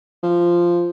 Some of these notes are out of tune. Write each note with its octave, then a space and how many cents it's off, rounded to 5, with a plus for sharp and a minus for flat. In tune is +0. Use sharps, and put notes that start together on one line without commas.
F3 -10